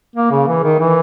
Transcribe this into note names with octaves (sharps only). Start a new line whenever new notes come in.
A#3
C#3
E3
D#3
E3